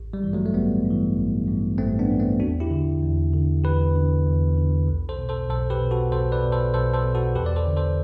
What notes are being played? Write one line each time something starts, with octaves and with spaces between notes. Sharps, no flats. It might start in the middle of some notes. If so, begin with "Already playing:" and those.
Already playing: A1
G3
G2 E3
F#3 A3
A3
A1 G3 B3
G2
E3
A1
G2 E3
A1 A3 C4
B3 D4
G2 E3
A3 C4
E2 D4 F#4
E4 G4
D3
E2
D3
E2 G4 B4
D3
E2
D3
B1
A4 C5
B2
A4 C5
B1 A4 C5
G4 B4
B2
F#4 A4
B1 A4 C5
B4 D5
B2
A4 C5
B1 A4 C5
A4 C5
B2
F#4 A4
E2 G4 B4
D5
A4 C5
D3
A4 C5